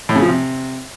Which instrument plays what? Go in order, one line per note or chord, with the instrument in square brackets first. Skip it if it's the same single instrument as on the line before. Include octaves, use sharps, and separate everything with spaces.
[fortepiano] A2
C#3
F3
C3